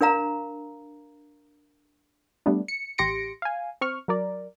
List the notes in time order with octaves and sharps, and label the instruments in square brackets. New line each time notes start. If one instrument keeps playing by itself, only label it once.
[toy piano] D4 A#4 F5 A#5
[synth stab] G3 A3 B3 D4
C#7
A1 G4 C6 A#6 C#7 D7
F5 G#5
C4 C#6 F6
F#3 A#4 D5